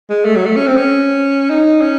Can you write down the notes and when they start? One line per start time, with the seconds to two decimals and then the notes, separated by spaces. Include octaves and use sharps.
0.10 G#3
0.25 A3
0.36 F#3
0.46 A3
0.56 C#4
0.67 C4
0.77 C#4
1.50 D#4
1.82 C#4